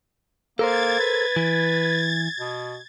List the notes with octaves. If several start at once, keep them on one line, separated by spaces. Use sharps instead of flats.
A#3 A4 A#4 C5 G#6 A6
B4
E3
B2